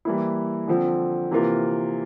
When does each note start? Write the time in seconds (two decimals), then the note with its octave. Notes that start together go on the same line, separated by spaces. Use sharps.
0.05 E3 G3 A#3 E4
0.68 D3 F3 C4
1.31 C3 E3 A#3 F4 A#4